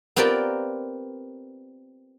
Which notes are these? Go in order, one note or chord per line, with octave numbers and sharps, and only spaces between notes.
B3 C4 F4 G4 A#4 D5